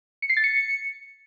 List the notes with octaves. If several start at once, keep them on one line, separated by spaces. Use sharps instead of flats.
C#7
C7
A6
C#7